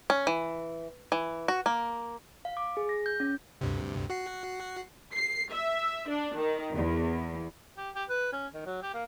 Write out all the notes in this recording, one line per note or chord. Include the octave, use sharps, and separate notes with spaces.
C#4
E3
E3
F#4
A#3
F5
D6
G#4
A#6
G6
C#4
D2 G2 C3
F#4 F#5 C7
C7
E5
D4
D#3
E2
G4
G4
B4
C#4
D#3
F#3
G4
A#3